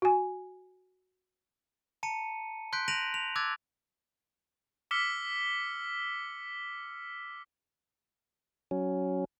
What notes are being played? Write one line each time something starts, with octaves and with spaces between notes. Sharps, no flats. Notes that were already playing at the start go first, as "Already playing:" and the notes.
F#4 G#5
A5 A#5 C#7 D#7
C6 F#6 G6 B6 D7
A#6 D7 D#7 F7 F#7
F7
D6 E6 F#6 G#6 A6
D6 E6 F6 B6 C#7 G7
F#3 C#4